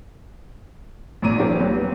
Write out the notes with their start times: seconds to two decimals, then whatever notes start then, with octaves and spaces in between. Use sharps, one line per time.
1.22 G#1 A#2 A#5 D#7
1.39 F3 G3 A#3 C#4 F4 G4
1.59 D#2 F#3 G3 B3